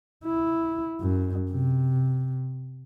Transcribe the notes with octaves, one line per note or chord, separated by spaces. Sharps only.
E4
F#2
C3